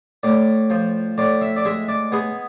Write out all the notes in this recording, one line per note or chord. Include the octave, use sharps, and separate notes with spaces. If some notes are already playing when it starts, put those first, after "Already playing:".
A2 D5
F3
A2 D5
E5
D5
G#3 E5
D5
B3 G#4